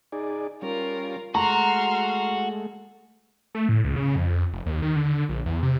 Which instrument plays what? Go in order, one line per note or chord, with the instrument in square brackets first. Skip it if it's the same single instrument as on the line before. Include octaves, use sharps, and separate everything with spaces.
[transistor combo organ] D#4 G#4 D5
[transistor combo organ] G3 C#4 [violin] F4 A#4
[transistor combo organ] G#3 A3 [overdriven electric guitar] F#4 [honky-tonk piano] A#5 [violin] C6 F6
[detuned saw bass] A3
A2
C#2
C#3
F2
F1
D#2
D#3
D3
A#1
E2
C3